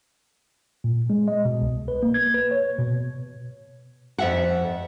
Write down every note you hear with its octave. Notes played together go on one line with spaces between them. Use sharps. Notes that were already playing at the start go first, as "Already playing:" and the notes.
A#2
G#3
D#5
B2
C2
B4
A#3
G#6
B4
C#5
B2
F2 E5 F#5